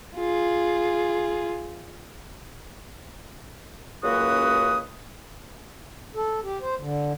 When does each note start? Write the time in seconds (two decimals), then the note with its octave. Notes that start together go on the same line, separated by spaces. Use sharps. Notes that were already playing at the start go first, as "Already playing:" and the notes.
0.16 F4 G#4
4.03 C#2 F#2 A#3 F#4 B4 D#6
6.15 A4
6.43 G4
6.61 C5
6.78 D3